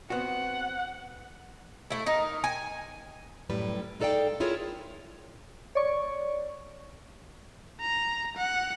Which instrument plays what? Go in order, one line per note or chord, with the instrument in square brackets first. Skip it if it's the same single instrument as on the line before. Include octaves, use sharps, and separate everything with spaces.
[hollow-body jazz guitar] B3 C4 F#4 [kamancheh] F#5
[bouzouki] A3 E4
D#4 A#4
G#5
[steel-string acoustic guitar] F#2 A2 G3 B4
G#3 D#4 A4 D5 F5 G5
E4 F4 G#4 A#4 C#5
[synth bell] C#5 D5 C#6
[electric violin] A#5
F#5